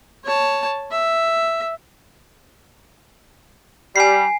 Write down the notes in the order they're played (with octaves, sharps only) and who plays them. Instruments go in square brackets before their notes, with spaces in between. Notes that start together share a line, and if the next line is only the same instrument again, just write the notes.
[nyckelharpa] C#5 A5
E5
[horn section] G3 [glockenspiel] G#5 C7